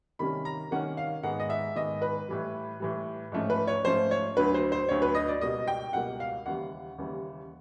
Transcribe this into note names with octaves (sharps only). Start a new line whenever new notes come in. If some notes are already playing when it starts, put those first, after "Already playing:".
C3 D#3 G3 A#3 C#4 B5
A#5
C3 D#3 G3 A#3 C#4 F#5
F5
G#2 D#3 G#3 B3 F#5
D#5
E5
G#2 D#3 G#3 B3 D#5
B4
A2 E3 G3
A2 E3 G3
G#2 F3 A3 C#4
B4
C#5
G#2 F3 A3 C#4 C5
C#5
D2 D3 F#3 B4
C5
C5
D2 D3 F#3 C#5
B4
D#5
D5
C#2 B2 G3 A#3 D#5
G5
C#2 B2 G3 A#3 F#5
F5
D#2 C#3 E3 G3 F#5
D#2 C#3 E3 G3